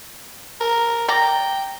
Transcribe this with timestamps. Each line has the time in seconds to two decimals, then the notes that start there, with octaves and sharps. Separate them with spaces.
0.60 A#4
1.08 D5 G5 A#5